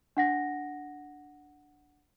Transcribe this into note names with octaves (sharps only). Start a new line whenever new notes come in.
D4 F#5 A#6